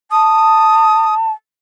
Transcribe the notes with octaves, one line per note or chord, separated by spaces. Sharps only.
A5 D#6